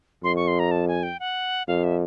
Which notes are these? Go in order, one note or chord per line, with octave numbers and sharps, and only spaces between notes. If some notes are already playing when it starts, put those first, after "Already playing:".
F2 C6
C#6
C6
A#5
A5
G#5
G5
F#5
F2 F5
E5